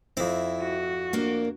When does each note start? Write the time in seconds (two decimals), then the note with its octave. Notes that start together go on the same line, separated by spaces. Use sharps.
0.17 F2 C4 E4
0.62 F#4
1.13 A#3 D4 A#4